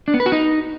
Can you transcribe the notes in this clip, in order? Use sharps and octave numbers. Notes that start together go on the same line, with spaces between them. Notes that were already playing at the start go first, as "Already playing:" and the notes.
D4
B3
B4
F#4
D#4